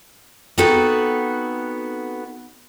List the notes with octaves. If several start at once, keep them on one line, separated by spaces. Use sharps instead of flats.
B3 C4 D#4 F#4 A4 B4